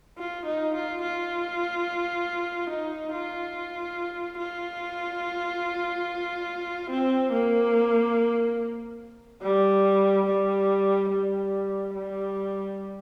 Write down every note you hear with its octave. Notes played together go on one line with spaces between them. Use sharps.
F4
D#4
F4
F4
D#4
F4
F4
C4
A#3
G3
G3
G3
G3